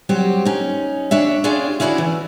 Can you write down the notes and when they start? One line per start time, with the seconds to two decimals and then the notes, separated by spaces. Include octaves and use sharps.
0.09 F#3 G3 C4 G4
0.45 C#4 D#4
1.11 D4 C#5 E5
1.44 C#4 D4 F4 G4 G#4 D5
1.80 C#4 E4 F#4 G#4 C5 D5
1.98 E3